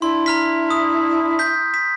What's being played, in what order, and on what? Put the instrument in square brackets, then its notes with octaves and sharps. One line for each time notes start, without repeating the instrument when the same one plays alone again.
[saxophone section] D4 E4 [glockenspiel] C6
[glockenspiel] A#5 F6 B6
D#6
G6 B6
B6